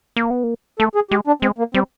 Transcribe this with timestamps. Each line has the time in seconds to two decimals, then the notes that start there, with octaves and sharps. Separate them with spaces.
0.17 A#3
0.30 B3
0.44 A#3
0.79 A3 A4
0.95 G#4
1.11 G#3 G4
1.27 D4
1.42 G#3 C4
1.58 A#3
1.74 G3 C4